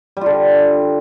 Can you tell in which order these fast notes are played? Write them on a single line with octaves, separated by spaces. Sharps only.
G3 F4 D3